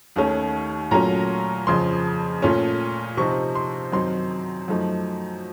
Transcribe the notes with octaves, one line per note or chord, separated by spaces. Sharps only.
D#2 D#3 A3 C#4
A#2 F#3 A3 C#4 A#5
F2 C#3 F3 C6
A#2 A3 C#4
C3 F3 C4 D#4 C#6
C6
F#2 D#3 F#3 C4 D#4 C6
F#2 F3 A3 D#4